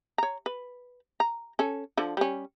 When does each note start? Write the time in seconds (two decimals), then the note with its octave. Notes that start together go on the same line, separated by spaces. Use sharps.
0.18 C#5 A#5
0.46 B4
1.20 A#5
1.59 C#4 A4
1.97 D3 F3
2.17 G3 C#4